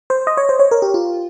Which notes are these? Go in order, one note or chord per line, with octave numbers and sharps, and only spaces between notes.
C5
D#5
C#5
C5
C#5
A#4
G4
F4